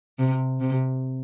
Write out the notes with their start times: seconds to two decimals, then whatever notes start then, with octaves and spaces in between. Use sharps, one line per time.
0.19 C3
0.61 C3